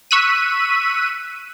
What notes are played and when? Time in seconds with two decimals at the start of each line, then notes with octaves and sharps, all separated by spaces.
0.11 C#6 E6 F#6 B6 D#7